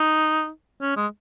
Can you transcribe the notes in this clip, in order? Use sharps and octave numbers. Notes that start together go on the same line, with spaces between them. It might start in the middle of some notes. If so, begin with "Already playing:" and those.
Already playing: D#4
C#4
G#3